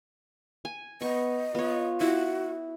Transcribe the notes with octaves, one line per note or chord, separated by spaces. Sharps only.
G#5
B3 D#5 C#6
B3 F4 C#5
E4 F#4